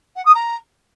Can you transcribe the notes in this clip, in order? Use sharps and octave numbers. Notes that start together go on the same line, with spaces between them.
F#5
D#6
A#5